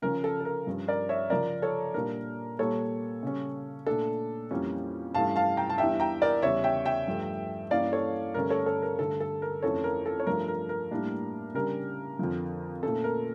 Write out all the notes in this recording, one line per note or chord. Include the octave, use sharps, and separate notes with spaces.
C#3 F3 C#4 A#4
A4
A4
A#4
G2 F3 C#4
A#4 D5
C#5 E5
C#3 F3 C#4 A#4 D5
A4 C#5
A#2 G3 D4 A#4
A#2 G3 A#3 A4 C#5
C#3 G3 C#4
A#2 A3 D4 A4
F2 E3 G3 A#3 C#4
G2 E3 A3 C#4 F5 A5
F5 A5
G5 A#5
A5
E2 E3 G3 D4 E5 G5
G5 A#5
A#4 D5
E2 C#3 G3 C#5 E5
E5 G5
E5 G5
G2 F3 A3
G2 E3 A#3 C#4 D5 F5
A4 C#5
G2 D3 A3 C#4 A#4
A4 C#5
A4 C#5
A#4
G2 D3 A3 A4
A4
A#4
F2 E3 A3 C#4 A4 C#5
A#4
A4
C#5
G2 F3 A3 D4 A#4
A#4
A#4
A2 G3 A#3 D4
C#3 G3 D4 A#4
F2 D3 F3
A#2 A3 C#4 A4
A#4